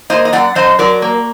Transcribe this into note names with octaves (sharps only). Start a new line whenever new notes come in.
A#3 C5 D#5
D#5
F#2 D5 F#5
F#2 C5 D#5
F#3 A#4 D5
A#3